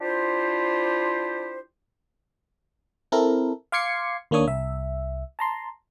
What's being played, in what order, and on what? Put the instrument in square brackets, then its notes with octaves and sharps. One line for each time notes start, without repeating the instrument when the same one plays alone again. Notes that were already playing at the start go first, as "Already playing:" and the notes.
[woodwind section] D4 E4 F4 G4 C5
[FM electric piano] C4 E4 A4 A#4
F5 C6 D6 G#6 C7 C#7
D#2 A#3 D4 C#5 D#6
C2 E5
A5 A#5 C6